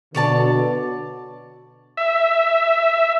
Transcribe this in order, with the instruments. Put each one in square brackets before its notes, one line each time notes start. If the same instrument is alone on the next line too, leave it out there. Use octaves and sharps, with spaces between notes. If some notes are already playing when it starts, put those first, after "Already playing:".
[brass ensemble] B2 D3 [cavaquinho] C#5 D5 A5
[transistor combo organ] E5